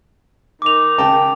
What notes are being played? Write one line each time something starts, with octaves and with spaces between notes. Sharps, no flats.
D#3 D#4 D6 F7
C#3 G5 A5